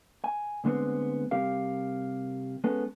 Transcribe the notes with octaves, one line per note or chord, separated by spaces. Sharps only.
G#5
D2 D3 G#3 A3 B3 C4
C3 G3 C4 G4 A#4 F5
G#3 B3 C#4 A4